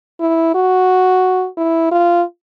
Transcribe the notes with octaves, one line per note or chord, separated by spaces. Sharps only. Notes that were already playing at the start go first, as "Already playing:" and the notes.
E4
F#4
E4
F4